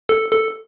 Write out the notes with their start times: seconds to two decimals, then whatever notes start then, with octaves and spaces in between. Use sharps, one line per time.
0.09 A4
0.32 A4